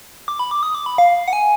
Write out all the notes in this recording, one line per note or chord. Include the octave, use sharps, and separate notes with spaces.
D6
B5
D6
D#6
D6
B5
F5
F#5
G#5